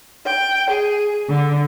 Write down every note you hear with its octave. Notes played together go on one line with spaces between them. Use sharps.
G5
G#4
D3